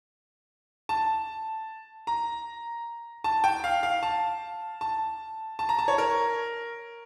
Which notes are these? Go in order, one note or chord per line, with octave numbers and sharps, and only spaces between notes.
A5
A#5
A5
G5
F5
F5
A5
A5
A5
A#5
A5
C#5
A#4